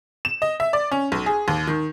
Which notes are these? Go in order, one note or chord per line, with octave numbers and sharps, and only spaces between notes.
E7
D#5
E5
D5
C#4
B1
G#4
D#2
D#3